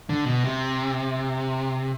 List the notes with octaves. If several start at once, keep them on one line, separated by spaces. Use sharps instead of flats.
D3
B2
C3